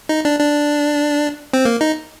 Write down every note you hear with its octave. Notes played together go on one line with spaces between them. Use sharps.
D#4
D4
D4
C4
A#3
D#4